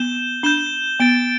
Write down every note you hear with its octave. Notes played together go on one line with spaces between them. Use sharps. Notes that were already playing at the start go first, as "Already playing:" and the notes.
Already playing: B3 G6 E7 G7
D4 G6 E7 G7
B3 A6 D7 G7